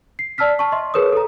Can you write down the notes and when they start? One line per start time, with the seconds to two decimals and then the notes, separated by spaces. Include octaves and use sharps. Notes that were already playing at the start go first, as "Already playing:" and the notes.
0.19 C7
0.38 D5 A5 E6 F6 B6
0.59 A5 C#6
0.72 D#5 E5 C6
0.94 G#4 A#4 B4 C#5 D#6
1.13 A4 A#5